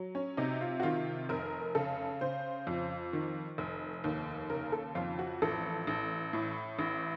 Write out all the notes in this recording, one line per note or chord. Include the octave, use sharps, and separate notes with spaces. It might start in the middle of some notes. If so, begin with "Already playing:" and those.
Already playing: F#3
C#4
C3 D#4
F4
F#4
D#3 F4
F1 A#4
C#3 A4
C#3 C5
F2
D#3
F1
D#2
C#3 A#4
A4
F2 F4
F#4
A1 A4
A1
A2
A1